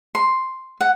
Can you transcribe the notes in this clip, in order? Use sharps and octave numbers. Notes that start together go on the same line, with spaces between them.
C6
F#5